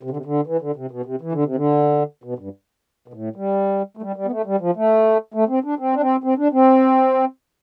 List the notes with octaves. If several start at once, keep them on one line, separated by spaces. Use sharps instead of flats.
C3
D3
C3
D3
E3
D3
C3
B2
C3
E3
D3
C3
D3
B2
G2
B2
A2
G3
A3
G3
G3
B3
A3
G3
F3
A3
A3
C4
D4
C4
D4
C4
C4
D4
C4